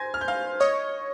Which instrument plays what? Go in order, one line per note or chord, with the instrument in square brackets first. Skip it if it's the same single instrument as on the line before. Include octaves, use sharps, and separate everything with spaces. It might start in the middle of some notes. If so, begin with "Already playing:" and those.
Already playing: [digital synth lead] C5 [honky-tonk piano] G#5 G#6 A#6
[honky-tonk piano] F6
G6
F5 F6
[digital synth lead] C#5 [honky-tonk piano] D#5 D#6